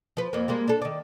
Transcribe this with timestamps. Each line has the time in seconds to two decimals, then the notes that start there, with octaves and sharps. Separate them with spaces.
0.17 F3 B4
0.33 F2 A#3
0.48 G3 G#3 A#3
0.68 D4 A4
0.82 D#3 D5